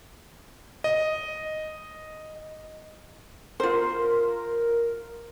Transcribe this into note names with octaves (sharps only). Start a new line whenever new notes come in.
D#5
F4 A#4 C5